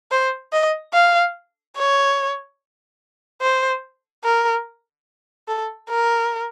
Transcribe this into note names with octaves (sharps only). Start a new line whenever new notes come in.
C5
D#5
F5
C#5
C5
A#4
A4
A#4